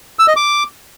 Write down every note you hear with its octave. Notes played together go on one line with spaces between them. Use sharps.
E6
D#5
D6